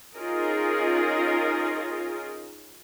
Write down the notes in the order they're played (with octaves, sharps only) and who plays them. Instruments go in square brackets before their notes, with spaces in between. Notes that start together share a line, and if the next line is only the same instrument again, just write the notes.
[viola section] C#4 D#4 F4 G#4 A#4 D#5